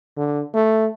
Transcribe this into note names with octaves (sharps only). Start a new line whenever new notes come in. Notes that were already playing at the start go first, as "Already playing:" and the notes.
D3
A3